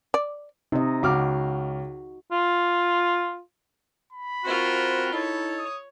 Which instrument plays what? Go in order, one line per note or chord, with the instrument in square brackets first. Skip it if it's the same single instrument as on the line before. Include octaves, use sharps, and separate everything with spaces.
[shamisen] D5
[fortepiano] C3 [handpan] D#4 D#5
[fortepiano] C#2 D6 F6 [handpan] F#4
[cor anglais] F4
[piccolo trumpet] B5
[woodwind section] C4 F#4 [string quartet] F4 A#4 C5
[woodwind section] D#4 E4 A4 [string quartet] C#5
[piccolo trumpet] D#6